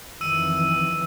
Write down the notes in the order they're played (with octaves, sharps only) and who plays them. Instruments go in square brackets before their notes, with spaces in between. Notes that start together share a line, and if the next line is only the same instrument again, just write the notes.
[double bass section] F2 D#3 E3 [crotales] E6 D#7